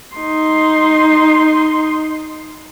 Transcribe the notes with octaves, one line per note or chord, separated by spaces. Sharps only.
D#4 C6